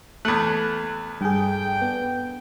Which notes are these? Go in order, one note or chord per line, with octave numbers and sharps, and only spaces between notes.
E2 A3 F#6
G2 D4 G#4 G5
B3